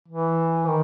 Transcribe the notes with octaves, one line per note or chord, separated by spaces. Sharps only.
E3
D#3